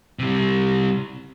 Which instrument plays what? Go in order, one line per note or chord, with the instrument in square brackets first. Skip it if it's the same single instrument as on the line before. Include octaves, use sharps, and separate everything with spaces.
[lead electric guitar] C3 G3